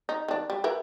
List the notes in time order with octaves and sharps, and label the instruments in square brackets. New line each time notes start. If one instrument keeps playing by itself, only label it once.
[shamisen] D#4
D#3 D4
G3
E4 A#4 B4